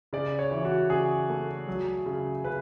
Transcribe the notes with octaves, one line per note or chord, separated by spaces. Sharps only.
C#3 D5
C#5
E3
F#4
C#3 G#4
A3
F#3
C#3
C#3 B4